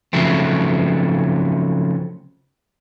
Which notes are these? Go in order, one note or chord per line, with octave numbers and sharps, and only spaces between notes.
C#3 F3 F#3 A3 C4